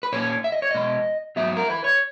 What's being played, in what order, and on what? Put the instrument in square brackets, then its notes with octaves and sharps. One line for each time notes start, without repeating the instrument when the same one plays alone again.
[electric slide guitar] B4
A#2 A#3 C#4 C#5
E5
D#5
C#5
B2 G#3 B3 D#5
G#2 F#3 B3 E5
A#4
B4
C#5